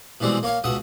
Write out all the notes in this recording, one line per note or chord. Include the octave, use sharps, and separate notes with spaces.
B2 E3 G3 G#3 C4
A#3 C#5 F5
C#2 B2 E5 F#5 D#6